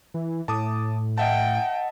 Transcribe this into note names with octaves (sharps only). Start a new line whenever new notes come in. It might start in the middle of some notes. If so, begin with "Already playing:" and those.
E3
A2 A5 D6 D#6
D#5 E5 F#5 G5 A5